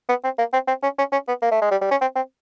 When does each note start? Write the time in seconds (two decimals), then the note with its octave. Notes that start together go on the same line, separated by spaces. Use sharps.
0.09 B3
0.24 C4
0.38 A#3
0.53 C4
0.68 C4
0.83 C#4
0.98 C#4
1.12 C#4
1.28 B3
1.42 A#3
1.51 A3
1.61 G#3
1.71 G3
1.81 G3
1.91 C#4
2.01 C4
2.16 C4